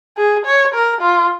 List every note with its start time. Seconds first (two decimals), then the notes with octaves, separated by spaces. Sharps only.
0.17 G#4
0.46 C#5
0.74 A#4
1.01 F4